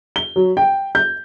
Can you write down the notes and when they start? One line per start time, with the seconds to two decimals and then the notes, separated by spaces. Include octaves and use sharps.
0.16 G7
0.36 F#3
0.57 G5
0.95 G6